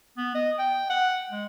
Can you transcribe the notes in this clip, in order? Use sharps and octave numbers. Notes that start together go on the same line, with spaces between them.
B3
D#5
G5
F#5
G#3